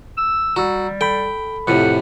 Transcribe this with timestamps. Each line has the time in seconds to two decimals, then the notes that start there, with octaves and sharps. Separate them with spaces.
0.18 E6
0.56 G3 F#4 A#5 E6
1.01 A4 G5 B5
1.67 F2 A2 C3 F#5